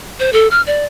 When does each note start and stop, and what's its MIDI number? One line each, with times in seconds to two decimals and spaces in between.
0.20 0.32 72
0.33 0.48 69
0.51 0.61 89
0.67 0.85 74